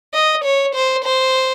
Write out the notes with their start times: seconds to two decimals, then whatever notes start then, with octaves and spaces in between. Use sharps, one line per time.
0.14 D#5
0.44 C#5
0.75 C5
1.04 C5